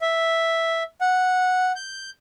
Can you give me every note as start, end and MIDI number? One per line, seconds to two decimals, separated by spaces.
0.01 0.83 76
1.01 1.72 78
1.76 2.10 91